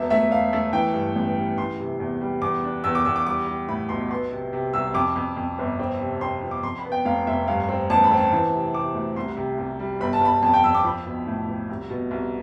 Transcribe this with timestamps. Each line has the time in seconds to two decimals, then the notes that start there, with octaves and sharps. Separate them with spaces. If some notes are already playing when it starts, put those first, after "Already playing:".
Already playing: E1 B3 E5
0.10 A3 E5
0.31 E1 F5
0.53 A3
0.73 E3 G5
0.94 G2
1.16 A1
1.37 G3
1.58 E3 C6
1.79 C3
2.00 E2
2.21 G3
2.42 E2 D6
2.63 D4
2.84 E2 E6
2.95 D6
3.05 E2 E6
3.16 D6
3.26 G3 D6
3.47 G3
3.69 A2 B5
3.89 B1 C6
4.10 B3 C6
4.31 C3
4.53 C3
4.73 C2 E6
4.94 F2 D6
5.16 F2
5.37 F2
5.59 G1
5.80 C4
6.00 C3
6.21 C4 C6
6.43 F3
6.51 D6
6.63 F2 C6
6.78 B5
6.85 B3
6.92 G5
7.05 F1 F5
7.27 F1 E5
7.48 G2 F5
7.69 C4
7.90 A1 A5
8.04 B5
8.11 C4
8.17 A5
8.33 E3
8.53 C3
8.74 C3 D6
8.95 D2
9.16 C2 C6
9.37 C3
9.58 C2
9.80 G3
10.00 G1 B5
10.13 A5
10.21 G1 B5
10.42 F2 A5
10.54 G5
10.64 F2 E6
10.75 D6
10.84 F3 B5
11.06 B1
11.27 A2
11.48 F3
11.69 C2
11.90 B2
12.11 C2